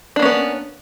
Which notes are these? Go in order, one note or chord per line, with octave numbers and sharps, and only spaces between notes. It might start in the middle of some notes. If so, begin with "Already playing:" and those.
A#3 B3 C#4 D4